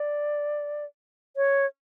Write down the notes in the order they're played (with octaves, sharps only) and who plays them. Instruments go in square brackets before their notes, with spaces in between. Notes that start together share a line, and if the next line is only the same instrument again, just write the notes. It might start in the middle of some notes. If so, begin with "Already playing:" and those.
Already playing: [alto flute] D5
C#5